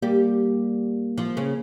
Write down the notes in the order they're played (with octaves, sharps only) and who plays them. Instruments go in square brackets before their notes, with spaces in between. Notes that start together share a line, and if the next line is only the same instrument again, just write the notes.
[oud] G3 G4 [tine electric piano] A#3
[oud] F3 F4
C#3 C#4